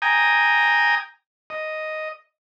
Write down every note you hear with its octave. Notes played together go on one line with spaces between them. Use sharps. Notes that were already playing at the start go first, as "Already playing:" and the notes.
G5 G#5 A#5 D#6
D#5